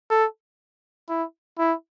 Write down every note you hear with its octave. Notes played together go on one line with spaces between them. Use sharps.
A4
E4
E4